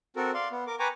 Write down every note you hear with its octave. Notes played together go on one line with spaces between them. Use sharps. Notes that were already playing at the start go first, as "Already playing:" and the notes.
C4 F#4 A4 A#4
D5 F5 C6
B3
A#4 D6
B4 G5 G#5 A#5 C#6 D6